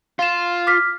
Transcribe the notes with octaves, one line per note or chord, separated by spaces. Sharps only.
F4 F5 E7
D6 F6 B6